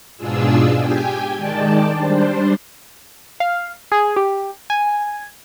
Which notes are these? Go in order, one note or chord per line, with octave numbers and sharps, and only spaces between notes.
G#2 B2 D4 F4 G#4 E6
G4 G5 G#5
D#3 G#3 D5 G5 A5
G3 D4 C5
F5
G#4
G4
G#5